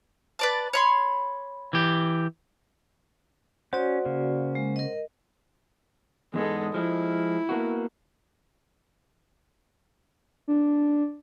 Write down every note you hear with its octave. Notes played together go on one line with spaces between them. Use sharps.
B4 D5 A5
C#5 B5 C6
E3 G4
C#4 F#4 C5 D5 F#5 G6
C#3 A#3
G#3
A#4 D#5
E2 G#2 G#3 B3 A4
F3 G#3 E4
A#3 B3 F#4
D4